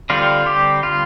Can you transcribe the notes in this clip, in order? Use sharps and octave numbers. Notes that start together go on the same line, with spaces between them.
D3 G3 C4 F4
G4
F4